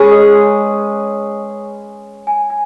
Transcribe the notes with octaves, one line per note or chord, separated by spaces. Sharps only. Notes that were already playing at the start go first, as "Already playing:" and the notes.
Already playing: G#3 C#4 G#4 B4 C#5 G#5 C#6
D#5 D#6
G#5
G#5
G#5